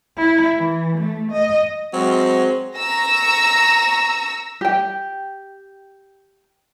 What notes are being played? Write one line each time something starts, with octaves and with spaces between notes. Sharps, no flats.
E4
E3
A3
D#5
F#3 G#3 C4
A#5 C#6 E6 A#6
G4 G5